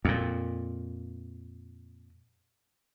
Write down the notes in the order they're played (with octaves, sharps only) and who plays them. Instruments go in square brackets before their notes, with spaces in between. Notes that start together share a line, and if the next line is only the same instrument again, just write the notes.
[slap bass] F2 A#2